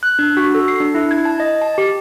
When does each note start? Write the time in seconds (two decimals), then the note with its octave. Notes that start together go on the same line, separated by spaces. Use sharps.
0.03 F#6
0.19 D4
0.37 F#4
0.55 A4
0.68 C7
0.80 D4
0.95 E4
1.11 G#6
1.25 A5
1.40 D#5
1.61 A5
1.78 G4